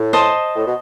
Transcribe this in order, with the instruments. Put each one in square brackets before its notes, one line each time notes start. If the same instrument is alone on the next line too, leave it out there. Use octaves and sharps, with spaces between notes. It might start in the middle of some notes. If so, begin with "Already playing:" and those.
Already playing: [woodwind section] A2
[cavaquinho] C5 D#5 A5 C6
[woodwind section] A2
B2